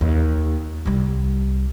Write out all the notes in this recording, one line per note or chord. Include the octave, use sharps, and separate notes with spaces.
D#2
C2 G3